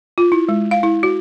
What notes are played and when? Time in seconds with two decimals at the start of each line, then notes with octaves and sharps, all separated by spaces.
0.18 F4
0.32 E4
0.48 G#3
0.71 F5
0.83 E4
1.03 F#4